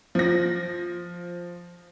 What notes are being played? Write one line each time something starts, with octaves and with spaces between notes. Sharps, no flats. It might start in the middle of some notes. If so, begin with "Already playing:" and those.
F3 A#6